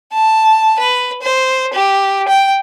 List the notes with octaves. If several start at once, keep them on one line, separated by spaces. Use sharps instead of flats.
A5
B4
C5
G4
G5